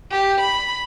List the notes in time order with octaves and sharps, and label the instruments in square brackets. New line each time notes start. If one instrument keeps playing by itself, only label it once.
[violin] G4
B5